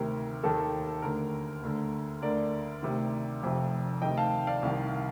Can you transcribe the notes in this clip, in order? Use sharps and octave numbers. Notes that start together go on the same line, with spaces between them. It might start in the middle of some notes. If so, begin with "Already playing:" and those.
Already playing: D2 C3 D#3 A#4
D#2 D#3 A4
D2 D3 A#4
D2 D3
D2 D3 A#4 D5
D2 C3 D#3
F1 F2 C3
D2 C3 D#3 D#5 G5
F5 A5
D5 F5
C2 C3 D#3